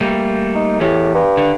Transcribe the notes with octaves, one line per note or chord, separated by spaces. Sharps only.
G3 A3 A#3
D#4
E2 A2 E3 G4
G2
D3